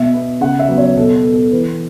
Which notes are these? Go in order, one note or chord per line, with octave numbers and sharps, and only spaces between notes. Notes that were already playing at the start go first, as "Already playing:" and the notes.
Already playing: B2 E5
B3
C#3 F#5
E5
F#3 B3
C#5
B2 A4
A4
B3
A4
E3 B4